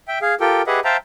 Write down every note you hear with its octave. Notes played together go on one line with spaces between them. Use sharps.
E5 G5
G#4 F5
F4 G4 A4 A#4 G5
G4 G#4 B4 D#5 E5 F#5
C5 E5 F5 G5 A5 A#5